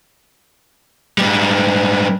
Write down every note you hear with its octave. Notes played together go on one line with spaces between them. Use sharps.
G#2 G3